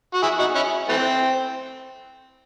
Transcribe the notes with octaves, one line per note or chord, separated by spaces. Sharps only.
F#4
E4 G#4
D#4 F#4
C#4 E4
E3 A3 C4